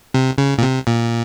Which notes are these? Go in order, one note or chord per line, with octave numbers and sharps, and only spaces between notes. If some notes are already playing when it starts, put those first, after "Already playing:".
C3
C#3
A#2
C3
A#2